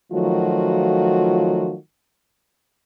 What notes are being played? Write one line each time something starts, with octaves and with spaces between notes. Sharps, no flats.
D#3 F3 F#3 A3 F4 F#4